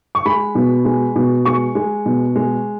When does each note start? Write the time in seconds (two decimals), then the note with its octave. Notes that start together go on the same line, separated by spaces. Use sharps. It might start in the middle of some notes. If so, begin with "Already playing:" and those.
0.15 C#6
0.25 G#3 B5
0.55 B2
0.85 G#3
1.16 B2
1.45 G#3 C#6
1.75 G#3
2.06 B2
2.36 G#3